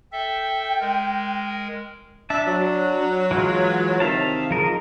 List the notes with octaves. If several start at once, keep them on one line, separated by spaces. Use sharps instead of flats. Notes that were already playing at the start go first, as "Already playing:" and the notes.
A4 E5 G5
G#3 A#4
D4 E5 A5
F#3
E3 G#3 F4
C3 D#3 E5 F5 A5
G#2 C#3 F3 A#4 D#5